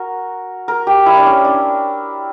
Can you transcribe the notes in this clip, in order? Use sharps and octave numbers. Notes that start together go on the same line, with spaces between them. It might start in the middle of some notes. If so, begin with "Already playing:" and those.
Already playing: F#4 A#4
A#4
G4
E4
D4
C#4
D4